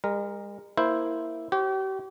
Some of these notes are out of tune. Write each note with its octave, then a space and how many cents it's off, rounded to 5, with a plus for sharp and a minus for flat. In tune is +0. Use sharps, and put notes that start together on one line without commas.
G#3 -45 A#4 +0
A#3 +0 E4 -5 C5 -5
G4 -40 C5 +45